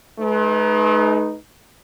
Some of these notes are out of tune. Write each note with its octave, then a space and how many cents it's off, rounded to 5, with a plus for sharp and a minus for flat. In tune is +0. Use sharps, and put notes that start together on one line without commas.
A3 -45 D#4 +0 B4 +0